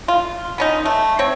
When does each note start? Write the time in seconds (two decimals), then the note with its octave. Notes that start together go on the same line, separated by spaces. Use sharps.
0.08 F4
0.58 B3 C#4 D#4
0.85 A3
1.19 C4 C#5